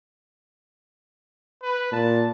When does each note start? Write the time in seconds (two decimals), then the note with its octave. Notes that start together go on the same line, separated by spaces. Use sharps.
1.63 B4
1.92 A#2 A5